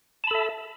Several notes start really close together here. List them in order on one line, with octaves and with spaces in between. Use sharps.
A5 B5 A4 E5